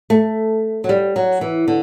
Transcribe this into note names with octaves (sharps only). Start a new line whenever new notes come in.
A3
F#3
G3
F#3
E3
D3